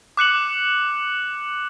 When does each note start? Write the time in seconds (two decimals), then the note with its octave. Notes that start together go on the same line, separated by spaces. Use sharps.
0.17 D6 F#6 C#7 F#7